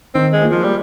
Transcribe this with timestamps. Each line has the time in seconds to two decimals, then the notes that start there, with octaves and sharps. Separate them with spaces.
0.15 D#3 C4
0.33 G#3
0.42 A#3 F4 G#4
0.52 F3
0.64 G3